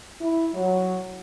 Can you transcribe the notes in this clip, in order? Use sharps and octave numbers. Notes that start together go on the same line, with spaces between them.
E4
F#3